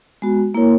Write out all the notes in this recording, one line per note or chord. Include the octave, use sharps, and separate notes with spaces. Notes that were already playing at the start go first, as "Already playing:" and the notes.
G#3 B3 F#4
A#3 E4 A#4 C#5